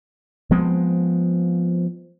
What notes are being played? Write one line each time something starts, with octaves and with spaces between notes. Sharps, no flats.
F3 G#3 B3 C4